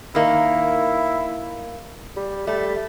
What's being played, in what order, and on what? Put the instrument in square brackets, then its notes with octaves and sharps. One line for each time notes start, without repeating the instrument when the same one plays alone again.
[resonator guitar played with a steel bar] D#3 A#3 [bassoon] E4
[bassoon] G3
[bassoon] G3 [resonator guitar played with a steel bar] A3